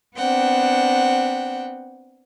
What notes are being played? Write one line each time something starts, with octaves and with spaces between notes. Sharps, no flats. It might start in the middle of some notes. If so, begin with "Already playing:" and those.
B3 C4 D4 F#5 G5